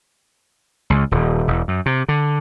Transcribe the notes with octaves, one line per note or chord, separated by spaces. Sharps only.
C#2
D#1
E1
F#2
C3
D3